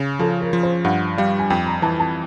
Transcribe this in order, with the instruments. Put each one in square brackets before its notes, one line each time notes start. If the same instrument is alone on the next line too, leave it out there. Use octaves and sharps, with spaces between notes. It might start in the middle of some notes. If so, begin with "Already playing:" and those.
Already playing: [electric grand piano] C#3
[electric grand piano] F3 [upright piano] A4
[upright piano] A#4
[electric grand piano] F3
[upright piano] C5
[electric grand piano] G2 [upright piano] F#5
[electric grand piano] G3 [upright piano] F5
[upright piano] G#5
[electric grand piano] F2 [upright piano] G5
[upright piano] A#5
[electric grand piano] E3 [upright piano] A5
[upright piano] A5